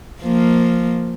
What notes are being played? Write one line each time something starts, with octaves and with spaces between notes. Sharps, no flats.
F3 A#3